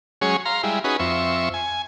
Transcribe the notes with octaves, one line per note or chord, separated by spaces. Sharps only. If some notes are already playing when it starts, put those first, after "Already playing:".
F#3 G#3 C#4 G#4 C#5
F5 A#5 C6
G3 G#3 E4
C#4 D#4 F#4 G#4 B4
F2 C4 E5 C#6
G#5